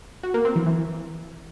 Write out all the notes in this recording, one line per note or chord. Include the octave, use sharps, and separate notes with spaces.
F#4
A#3
C4
E3
E3